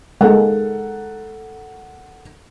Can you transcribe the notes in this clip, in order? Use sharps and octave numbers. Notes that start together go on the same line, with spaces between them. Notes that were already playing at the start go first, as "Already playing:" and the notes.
G#3 A#3 A4 A#4 F#5